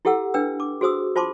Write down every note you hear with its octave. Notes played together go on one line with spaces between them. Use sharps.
E4 G4 A4 F#5 E6
D4 B4 G5 E6
D6
F#4 G#4 C5 D#6 E6
F4 C5 A5 C6 D6